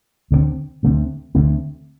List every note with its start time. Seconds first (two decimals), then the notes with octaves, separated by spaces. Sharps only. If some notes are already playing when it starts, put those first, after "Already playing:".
0.31 D2 D3 A3 C4
0.83 D2 D3 A3 C4
1.35 D2 D3 A3 C4